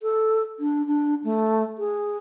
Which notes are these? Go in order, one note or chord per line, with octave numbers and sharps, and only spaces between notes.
A4
D4
D4
A3
G#4